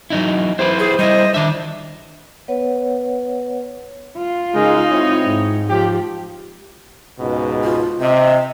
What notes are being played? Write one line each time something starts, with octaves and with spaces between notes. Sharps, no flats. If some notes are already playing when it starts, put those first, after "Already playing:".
F#3 D#4 E4
E4 G4 B4 C5
G#4
G3 E4 D#5
D#3 D4 E5
B3 B4 C#5 F#5
F4
C#3 G#3 D#4 A#4
C4 E4 C#5
G#2
F3 G4
C#2 G#2 B2
F4
C3 D#5